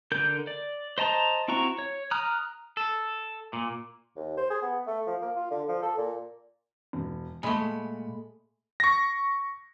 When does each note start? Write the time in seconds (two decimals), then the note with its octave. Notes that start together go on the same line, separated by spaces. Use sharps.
0.12 D3 A#4 G6
0.47 D5
0.98 C5 D#5 A5 A#5
1.48 C4 E4 F#4 A#5 C#6
1.79 C#5
2.11 A#5 D#6 F6 F#6
2.77 A4
3.53 A#2
4.16 D#2
4.37 C5
4.50 G#4
4.62 B3
4.87 A3
5.06 F3
5.21 A#3
5.36 F4
5.51 D3
5.68 F3
5.82 A4
5.98 A#2
6.93 E1
7.43 A#2 G#3 A3 B5
8.80 C#6 A#6